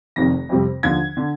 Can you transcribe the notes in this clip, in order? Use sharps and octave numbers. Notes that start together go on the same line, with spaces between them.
F1 F2 C3 D#3 A#6
F2 C3 G3 C4
D#2 D3 F3 G#6
D3